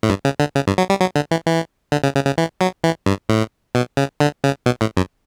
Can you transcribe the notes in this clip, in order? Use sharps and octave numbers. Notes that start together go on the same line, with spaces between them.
A2
G2
C#3
D3
C#3
G2
F#3
G3
F#3
D3
E3
E3
D3
C#3
C#3
C#3
E3
F#3
E3
G2
A2
B2
C#3
D3
C#3
B2
A2
F#2